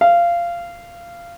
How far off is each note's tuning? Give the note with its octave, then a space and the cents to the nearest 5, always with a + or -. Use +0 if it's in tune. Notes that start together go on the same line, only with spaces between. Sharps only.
F5 -15